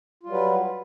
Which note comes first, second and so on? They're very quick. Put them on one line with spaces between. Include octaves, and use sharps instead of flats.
F4 G3 F#3 B4